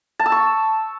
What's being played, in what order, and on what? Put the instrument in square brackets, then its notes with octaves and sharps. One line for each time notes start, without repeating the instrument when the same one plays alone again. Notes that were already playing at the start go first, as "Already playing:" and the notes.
[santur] A5
E6
C#6